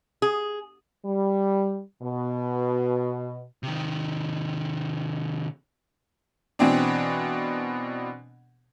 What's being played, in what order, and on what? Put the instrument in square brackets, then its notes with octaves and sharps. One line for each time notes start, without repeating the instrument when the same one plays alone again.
[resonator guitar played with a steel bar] G#4
[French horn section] G3
B2
[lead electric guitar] C3 D#3
[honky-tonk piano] B2 E3 C4 D4